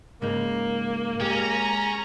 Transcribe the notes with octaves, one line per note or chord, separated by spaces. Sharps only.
G#2 C#3 A#3 D#4
G#3 C#4 G4 A#5